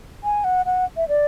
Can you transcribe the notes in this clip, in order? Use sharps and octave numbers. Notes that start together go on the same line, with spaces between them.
G#5
F#5
F#5
E5
D5